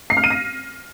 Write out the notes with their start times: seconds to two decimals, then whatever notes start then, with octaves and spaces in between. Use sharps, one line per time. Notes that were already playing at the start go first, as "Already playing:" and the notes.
0.10 C7
0.17 F6
0.24 D#7
0.30 A#6